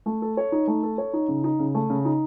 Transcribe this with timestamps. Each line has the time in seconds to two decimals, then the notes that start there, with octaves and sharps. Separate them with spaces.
0.06 A3
0.22 A4
0.37 C#5
0.52 D#4
0.67 A3
0.83 A4
0.98 C#5
1.13 D#4
1.28 C#3
1.44 D#4
1.59 C#3
1.75 A3
1.90 C#3
2.05 D#4